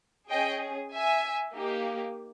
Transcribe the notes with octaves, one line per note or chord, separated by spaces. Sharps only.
C#4 G#4 D#5 G5
E5 G#5
A#3 D#4 G4